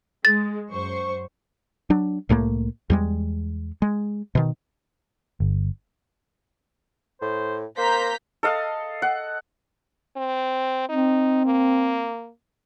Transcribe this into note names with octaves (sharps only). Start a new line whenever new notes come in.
G#3 A6
F#2 C5 C#6
F#3 D4
C2 A2 A3 A#3
E2 G3 G#3
G#3
B2 D#3
G1
A2 C5
A#3 C5 A#5 G6 B6
A4 D#5 F5
F#5
C4
C4 D#4
A#3